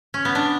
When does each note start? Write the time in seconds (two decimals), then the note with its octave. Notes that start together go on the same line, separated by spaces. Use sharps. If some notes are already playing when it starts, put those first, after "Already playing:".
0.14 C#4
0.25 B3
0.35 D4